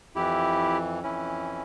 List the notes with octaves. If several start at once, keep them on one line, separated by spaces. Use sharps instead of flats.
F2 E3 E4 G4
F2 E3 C#4 E4